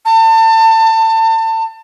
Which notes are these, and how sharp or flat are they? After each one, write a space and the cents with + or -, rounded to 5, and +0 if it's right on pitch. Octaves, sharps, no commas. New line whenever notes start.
A5 +30